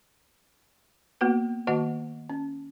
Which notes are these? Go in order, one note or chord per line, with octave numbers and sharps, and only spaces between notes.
A#3 B3 F#4 B4
D#3 A#3 F#4 D#5 F#5 A5
C#4